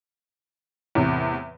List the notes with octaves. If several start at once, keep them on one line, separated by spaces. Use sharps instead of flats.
E2 A2 C3